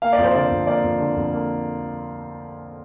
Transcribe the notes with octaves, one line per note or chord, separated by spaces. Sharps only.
A#3 F5
D5
F2
C5
D3 D5
F2
A#3 D5
F2
D3
F2
A#3